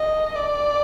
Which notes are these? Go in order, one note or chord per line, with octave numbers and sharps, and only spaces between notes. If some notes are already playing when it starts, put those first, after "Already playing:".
Already playing: D#5
D5